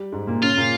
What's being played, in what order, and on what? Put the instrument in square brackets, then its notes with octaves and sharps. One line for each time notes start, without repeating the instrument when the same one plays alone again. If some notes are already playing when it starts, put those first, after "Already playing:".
Already playing: [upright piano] G3
G#2 G#3
A#2 A#3
[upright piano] C#3 C#4 [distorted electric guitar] F4
[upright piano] A#2 A#3